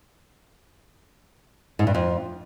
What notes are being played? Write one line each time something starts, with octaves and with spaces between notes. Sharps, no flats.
G#2
G2
F2